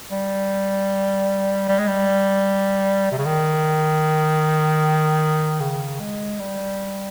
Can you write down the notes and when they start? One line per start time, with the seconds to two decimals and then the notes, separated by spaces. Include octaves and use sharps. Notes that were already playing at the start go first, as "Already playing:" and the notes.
0.12 G3
1.69 G3
1.79 G#3
1.88 G3
3.11 C3
3.18 C#3
3.26 D#3
5.60 C#3
6.00 G#3
6.39 G3